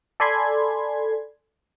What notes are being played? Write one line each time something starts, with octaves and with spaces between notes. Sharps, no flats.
A4 D5 G#5 B5 C6 G#6